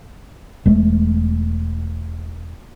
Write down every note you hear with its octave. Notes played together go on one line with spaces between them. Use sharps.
E1 G#3 A3